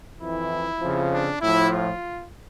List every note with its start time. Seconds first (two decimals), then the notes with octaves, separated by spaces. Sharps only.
0.19 F2 E3 E4
0.80 F2 C#3 F3
1.11 D4
1.41 A2 F3 E4
1.71 F4